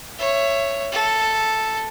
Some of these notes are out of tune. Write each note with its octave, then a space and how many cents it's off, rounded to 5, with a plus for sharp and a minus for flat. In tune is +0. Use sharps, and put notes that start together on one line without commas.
C#5 +0 E5 +20
A4 +0 E5 +0